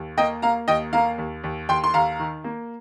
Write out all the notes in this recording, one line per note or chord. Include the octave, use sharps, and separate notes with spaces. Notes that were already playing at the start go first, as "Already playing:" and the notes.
Already playing: D#2
A#3 D#5 G5
A#3 F5 A#5
D#2 D#5 G5
A#3 F5 A#5
D#2
D#2
D#2 G5 C6
C6
D#2 F5 A#5
D#3
A#3